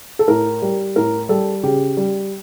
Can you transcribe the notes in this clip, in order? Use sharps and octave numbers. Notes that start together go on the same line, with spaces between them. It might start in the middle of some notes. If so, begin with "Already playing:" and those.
A4
A2 A#4
G3
A2 A#4
G3 A4
C#3 G4
G3